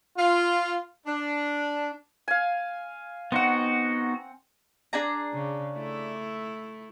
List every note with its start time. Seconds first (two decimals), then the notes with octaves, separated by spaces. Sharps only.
0.17 F4
1.07 D4
2.28 F5 G#5
3.32 B3 C4 D#4 F#4 F#5
4.93 D4 G#4 A#5
5.33 C#3
5.76 A3 E4